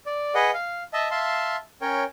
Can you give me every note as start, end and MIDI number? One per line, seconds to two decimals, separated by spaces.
0.06 0.34 74
0.35 0.51 68
0.35 0.51 71
0.35 0.51 75
0.35 0.51 78
0.54 0.83 77
0.93 1.08 75
0.93 1.08 76
0.93 1.08 81
1.11 1.56 76
1.11 1.56 77
1.11 1.56 81
1.11 1.56 84
1.82 2.04 61
1.82 2.04 70
1.82 2.04 73
1.82 2.04 79